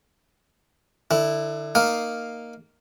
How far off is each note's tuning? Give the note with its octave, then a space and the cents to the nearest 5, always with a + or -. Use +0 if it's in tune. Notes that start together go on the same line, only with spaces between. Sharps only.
D3 +30 E4 +0
A#3 +0 D#4 -5 F5 +0